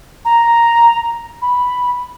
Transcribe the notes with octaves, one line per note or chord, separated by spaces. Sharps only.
A#5
B5